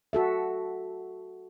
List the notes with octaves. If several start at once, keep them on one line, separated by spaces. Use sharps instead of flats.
F#4 A4 E5